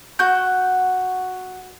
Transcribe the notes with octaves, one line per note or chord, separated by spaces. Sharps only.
F#4 G6